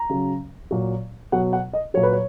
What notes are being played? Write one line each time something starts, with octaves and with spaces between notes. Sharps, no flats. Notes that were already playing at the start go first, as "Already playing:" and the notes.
Already playing: A#5
C#3 F#3
A#2 F#3
B2 F#3 F#5
F#5
D#5
A#2 F#3 C#5
B4
C#5